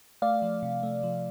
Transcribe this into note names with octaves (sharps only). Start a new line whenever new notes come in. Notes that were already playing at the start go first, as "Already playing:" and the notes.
A3 D5 F5
F3
C3
A3
F3